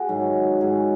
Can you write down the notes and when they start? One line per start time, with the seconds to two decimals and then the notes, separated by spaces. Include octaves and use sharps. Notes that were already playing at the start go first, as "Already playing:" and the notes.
Already playing: F#4 G#4
0.09 G#2 D#3 F#3
0.60 G#2 D#3 F#3 G#4